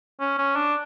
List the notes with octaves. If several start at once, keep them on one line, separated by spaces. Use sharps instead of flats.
C#4
C#4
D4